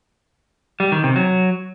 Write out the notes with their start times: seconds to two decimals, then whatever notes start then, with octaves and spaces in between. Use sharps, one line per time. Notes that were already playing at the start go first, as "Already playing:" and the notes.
0.80 G3
0.92 D#3
1.04 C3
1.16 F#3